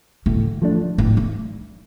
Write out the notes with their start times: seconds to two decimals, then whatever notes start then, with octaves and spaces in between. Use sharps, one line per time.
0.26 A2 D3
0.62 F3 A3 D4
0.98 A2 E3
1.17 A3